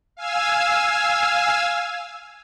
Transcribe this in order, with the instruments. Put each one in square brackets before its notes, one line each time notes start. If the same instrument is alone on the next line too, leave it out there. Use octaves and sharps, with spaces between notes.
[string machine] F5 G#5 E6